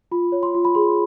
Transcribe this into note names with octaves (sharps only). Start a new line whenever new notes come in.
F4 B5
C#5
C6
F4
B5
G#4 C6